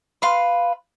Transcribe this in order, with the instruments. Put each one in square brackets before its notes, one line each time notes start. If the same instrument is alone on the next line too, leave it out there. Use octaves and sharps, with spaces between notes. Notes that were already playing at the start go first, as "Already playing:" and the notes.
[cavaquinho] B4 F5 C6